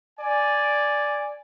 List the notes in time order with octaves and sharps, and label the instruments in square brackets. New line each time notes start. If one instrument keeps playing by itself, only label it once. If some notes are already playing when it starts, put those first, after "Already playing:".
[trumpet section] D5 G#5